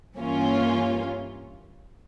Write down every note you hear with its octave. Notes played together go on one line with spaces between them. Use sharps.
G2 E3 A#3 C#4 F4